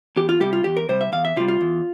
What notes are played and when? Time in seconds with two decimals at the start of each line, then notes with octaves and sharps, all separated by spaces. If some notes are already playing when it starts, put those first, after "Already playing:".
0.16 E2 G4
0.29 F4
0.40 C3 G3 G4
0.53 F4
0.64 E2 G4
0.77 A#4
0.89 C3 G3 C5
1.01 E5
1.12 E2 F5
1.25 E5
1.36 C3 F4
1.40 G3
1.48 F4
1.61 E2